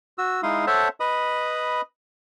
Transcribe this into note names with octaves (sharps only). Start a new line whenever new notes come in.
F#4 E6
G#3 D#4 E4 F5 C6 D#6
A4 C5 C#5 E5 F#5 A5
B4 D#5 B5 D#6